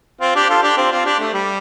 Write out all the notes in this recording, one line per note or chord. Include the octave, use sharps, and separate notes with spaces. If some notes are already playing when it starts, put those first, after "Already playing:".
C4 F4
D4 G4
F4 A4
D4 G4
C4 F4
C4 F4
D4 G4
A3
G3